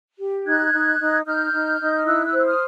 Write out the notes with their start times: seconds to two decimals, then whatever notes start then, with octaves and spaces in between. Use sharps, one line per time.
0.19 G4
0.46 D#4 F#6 G#6
0.72 D#4
1.00 D#4
1.26 D#4 F6 G6
1.53 D#4
1.80 D#4
1.96 F6
2.06 E4 E6 F#6
2.26 E6 F#6
2.33 C5
2.39 E6
2.46 D#6 F6